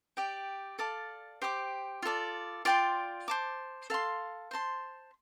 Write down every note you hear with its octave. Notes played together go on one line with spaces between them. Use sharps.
G4 D5 G5
A4 D5 F5 A5
G4 C5 G5 D6
F4 A4 D5
F4 D5 G5 C6
C5 A5 D6
A4 F5 C6
C5 A5 C6